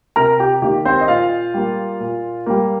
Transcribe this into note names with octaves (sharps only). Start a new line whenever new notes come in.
C3 A#4 A#5
G4 G5
D#3 A#3 G4
C4 C5
D#5
A#2 F4 F5
G3 A#3
A#2
G3 A#3